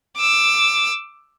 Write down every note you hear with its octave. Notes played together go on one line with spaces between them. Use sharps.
D6 E6